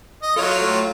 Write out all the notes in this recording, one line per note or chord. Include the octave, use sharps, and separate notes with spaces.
D#5
F#3 F4 A4 C#5
A3 C#5